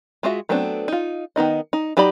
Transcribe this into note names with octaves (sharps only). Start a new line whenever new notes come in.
G#3 F4 F#4 E5
F#3 A3 B3 C4 D4
D#4 F4
D#3 B3 D#4 D#5
D#4
F#3 D#4 G4 D5 B5